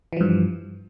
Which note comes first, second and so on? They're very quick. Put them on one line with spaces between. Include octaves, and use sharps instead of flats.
E3 F3 G2